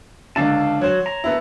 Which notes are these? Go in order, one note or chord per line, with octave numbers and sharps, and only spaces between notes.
C#2 D3 F5 A5
F#3 C5 C#5
A#5
A3 B3 E4